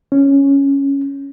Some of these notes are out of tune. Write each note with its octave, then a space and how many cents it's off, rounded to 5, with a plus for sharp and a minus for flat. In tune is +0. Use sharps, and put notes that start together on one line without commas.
C#4 +0